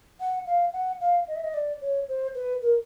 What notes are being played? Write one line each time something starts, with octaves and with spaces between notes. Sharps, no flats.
F#5
F5
F#5
F5
D#5
E5
D#5
D5
C#5
C5
B4
A#4